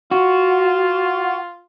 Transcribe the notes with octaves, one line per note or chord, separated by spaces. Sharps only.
F4 F#4